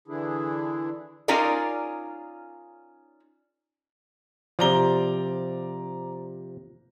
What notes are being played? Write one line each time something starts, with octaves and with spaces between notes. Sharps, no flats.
D3 E3 D4 E4 G#4
C#4 D#4 F4 G#4 A#4 D5
C3 F3 D5 A#5 G7